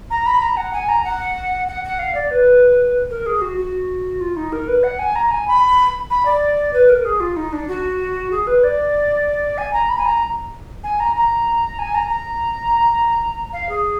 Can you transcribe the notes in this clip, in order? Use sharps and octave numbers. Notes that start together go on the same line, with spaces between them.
A#5
B5
A#5
F#5
G#5
A#5
F#5
F#5
F#5
F5
D5
B4
A#4
G#4
F#4
F#4
F4
D#4
A#4
B4
F#5
G#5
A#5
G#5
B5
B5
D5
B4
A#4
G#4
F4
D#4
D4
F#4
G#4
B4
D5
G#5
A#5
B5
G#5
A#5
G#5
A#5
A#5
G#5
A#5
A#5
F5
G#4